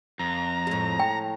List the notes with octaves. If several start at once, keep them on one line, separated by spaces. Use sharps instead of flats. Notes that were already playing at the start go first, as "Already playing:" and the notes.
F2 A#5
A2 G#3
G5